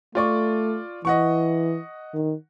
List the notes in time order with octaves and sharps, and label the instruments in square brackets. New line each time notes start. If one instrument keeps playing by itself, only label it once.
[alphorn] A3 [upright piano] F4 D5 C#6
[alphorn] E3 [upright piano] D#5 F#5 C#6
[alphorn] D#3